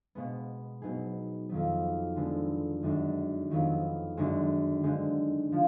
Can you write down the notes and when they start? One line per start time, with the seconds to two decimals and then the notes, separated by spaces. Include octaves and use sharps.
0.15 B2 G#3 B3
0.82 B2 F#3 B3 D#4 G#4
1.49 F2 D#3 F#3 B3
2.16 D3 G#3 B3
2.83 F#2 D#3 G#3 D4 F#4
3.50 F2 D#3 F#3 B3
4.17 F#2 D3 G#3 D#4 F#4
4.83 D3 G#3 D#4
5.52 D3 F3